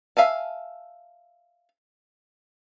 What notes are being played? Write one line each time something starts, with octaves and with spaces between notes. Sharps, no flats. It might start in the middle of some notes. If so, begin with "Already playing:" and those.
E5 F5 G#5 A5